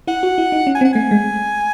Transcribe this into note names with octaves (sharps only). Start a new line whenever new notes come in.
E4 F#5
F#4
E4
D#4
C#4
G#5
C4
F#5
A3 G#5
G#3